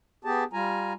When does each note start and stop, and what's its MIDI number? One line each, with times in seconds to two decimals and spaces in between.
0.25 0.44 59
0.25 0.44 67
0.25 0.44 68
0.25 0.44 81
0.53 0.93 55
0.53 0.93 65
0.53 0.93 80
0.53 0.93 82